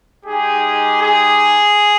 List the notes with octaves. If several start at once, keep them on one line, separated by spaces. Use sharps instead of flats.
G#3 D#4 G4 G#4
G#4